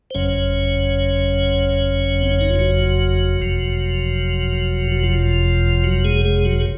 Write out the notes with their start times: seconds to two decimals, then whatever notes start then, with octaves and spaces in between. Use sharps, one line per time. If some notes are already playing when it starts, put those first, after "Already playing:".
0.11 C5
0.15 F#1 F2 C#3 F#3 C#4 C#5
2.22 C4
2.32 C#4
2.41 D#4
2.49 F4
2.59 F#3 F#4
3.40 F#1 F2 C3 F3
4.92 F#4
5.04 F3 F4
5.84 F#3 F#4
6.05 G#3 G#4
6.25 G#3 G#4
6.45 F#3 F#4
6.60 G#4